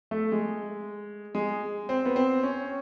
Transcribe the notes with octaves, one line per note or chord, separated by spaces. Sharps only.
A3
G#3
G#3
C4
B3
C4
C#4